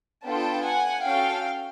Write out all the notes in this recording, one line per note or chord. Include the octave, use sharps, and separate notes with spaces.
B3 D4 F4 A4 G5 A5
F#5 G#5
C#4 F#4 A4 F5 G5